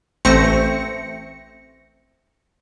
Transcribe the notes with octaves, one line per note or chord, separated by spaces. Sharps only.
A1 A3 C4 C5 A#6 C#7